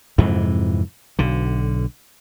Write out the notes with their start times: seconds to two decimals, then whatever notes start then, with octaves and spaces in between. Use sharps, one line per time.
0.18 F2 G#2 C3 E3
1.19 B1 D3